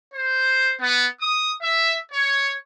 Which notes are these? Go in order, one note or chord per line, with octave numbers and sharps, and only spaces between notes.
C5
B3
D#6
E5
C#5